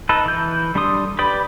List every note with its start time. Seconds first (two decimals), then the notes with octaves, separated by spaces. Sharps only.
0.09 D#4 A4 B4
0.26 E3 G6
0.75 G3 D4 A4 C6 D#6
1.19 G4 B4 D5 B5 D#6